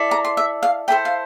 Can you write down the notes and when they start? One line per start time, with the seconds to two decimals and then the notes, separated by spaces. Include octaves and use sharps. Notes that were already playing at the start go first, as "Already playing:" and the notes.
Already playing: E4 A4 D5
0.11 A#5
0.25 C6
0.37 E5
0.63 F5
0.88 E4 A4 C5 G5
1.05 F5